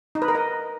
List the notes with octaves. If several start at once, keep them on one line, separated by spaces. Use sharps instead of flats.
D#4
B4
A#4
D#5